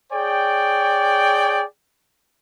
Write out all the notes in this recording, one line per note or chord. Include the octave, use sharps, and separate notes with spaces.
G#4 C#5 D5 G5